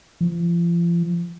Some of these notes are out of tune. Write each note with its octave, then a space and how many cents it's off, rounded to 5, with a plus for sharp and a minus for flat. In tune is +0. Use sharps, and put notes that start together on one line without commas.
F3 -35